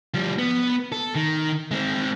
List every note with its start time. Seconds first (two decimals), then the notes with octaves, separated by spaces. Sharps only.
0.14 F3 G3
0.39 B3
0.92 A4
1.15 D#3
1.71 G#3 C4